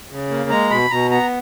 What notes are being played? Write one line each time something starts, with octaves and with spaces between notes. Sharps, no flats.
C#3
A#3
G#3 A#5
B2 B5
B2 A#5
B3 A#5